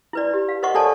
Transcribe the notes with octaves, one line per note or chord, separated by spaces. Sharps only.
E4 B4 D5
G4
F5
A#4 C5 D#5 F#5 C#6 D6
A4 A#4 C#5 D5 G#5 A5